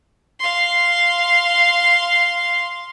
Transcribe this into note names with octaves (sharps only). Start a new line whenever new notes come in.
F5 C6